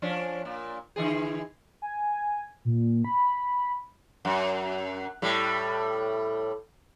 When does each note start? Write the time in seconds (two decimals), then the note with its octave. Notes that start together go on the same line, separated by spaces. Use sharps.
0.02 F3 C#4 D4
0.45 A#2 A#3
0.96 D3 E3 G#4
1.82 G#5
2.65 A#2
3.05 B5
4.25 F#2
5.22 A2 G3